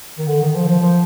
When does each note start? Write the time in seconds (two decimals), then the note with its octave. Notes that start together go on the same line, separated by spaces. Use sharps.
0.18 D#3
0.28 D3
0.42 D#3
0.55 F3
0.68 F3
0.82 F3